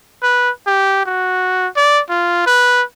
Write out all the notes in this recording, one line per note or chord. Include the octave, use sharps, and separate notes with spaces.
B4
G4
F#4
D5
F4
B4